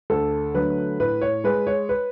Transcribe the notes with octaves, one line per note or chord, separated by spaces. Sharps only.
D2 A4
D3 F#3 A3 B4
A2 B4
C#5
G#3 B4
C#5
B4